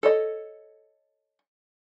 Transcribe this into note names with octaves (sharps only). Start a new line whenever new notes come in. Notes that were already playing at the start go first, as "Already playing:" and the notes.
A4 C#5 D#5